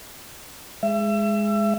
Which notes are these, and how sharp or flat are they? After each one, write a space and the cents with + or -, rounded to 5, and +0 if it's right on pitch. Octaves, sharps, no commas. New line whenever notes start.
G#3 +0 E5 +30